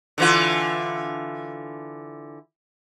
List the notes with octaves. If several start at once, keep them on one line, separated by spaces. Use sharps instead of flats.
D3 E3 F4